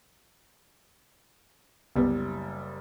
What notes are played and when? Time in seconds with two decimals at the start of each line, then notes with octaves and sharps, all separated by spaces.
1.96 F#1 C2 G3 B3